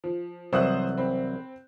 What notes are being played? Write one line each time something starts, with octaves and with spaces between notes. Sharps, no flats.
F3
C2 E3 F#3 C5 D#6 F#6
C4 B5